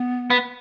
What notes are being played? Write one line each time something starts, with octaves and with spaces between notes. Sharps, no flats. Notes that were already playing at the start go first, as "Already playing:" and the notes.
Already playing: B3
B3